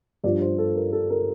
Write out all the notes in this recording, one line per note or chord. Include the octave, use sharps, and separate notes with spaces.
G2 F3 D5
C5
A4
A#4
A4
A#4